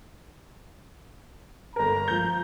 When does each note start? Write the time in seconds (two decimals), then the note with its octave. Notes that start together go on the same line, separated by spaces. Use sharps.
1.76 G1 A#4 A#5
2.08 F3 G6